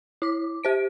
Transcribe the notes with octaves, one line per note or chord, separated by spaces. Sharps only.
E4 D6
G4 C5 D7